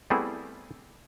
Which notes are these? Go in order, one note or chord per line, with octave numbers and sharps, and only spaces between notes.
G3 A3 B3 C4 E4 G#4